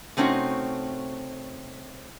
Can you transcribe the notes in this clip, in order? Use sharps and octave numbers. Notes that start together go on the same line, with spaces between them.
C3 A3 C4 C#4 D#4 F#4